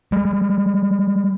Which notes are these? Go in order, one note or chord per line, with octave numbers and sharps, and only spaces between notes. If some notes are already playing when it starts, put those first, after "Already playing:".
G3 G#3